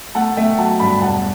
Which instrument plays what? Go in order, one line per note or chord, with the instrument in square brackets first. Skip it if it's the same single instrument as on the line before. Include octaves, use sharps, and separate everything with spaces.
[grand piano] A3 F#5 A5
A3 E5 G5
F#3 F#5 A5
G2 G5 B5
E1 F#5 A5